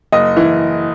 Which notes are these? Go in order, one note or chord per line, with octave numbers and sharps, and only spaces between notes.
F#1 D#5
E3